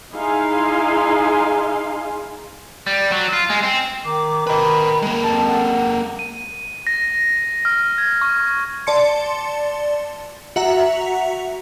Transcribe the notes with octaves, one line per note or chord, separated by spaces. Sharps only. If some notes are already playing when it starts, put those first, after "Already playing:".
D#4 E4 G#4 F5 G#5 C6
G3
F#3
F4
G#3
C4
D#3 D6
D#3 B4 D#5 B5
G#3 A#3
F2 A5
F#5
D#7
A#6
F6
G#6
C#6
D5 A5 C6 C#7
F#4 E5 F#5 A#5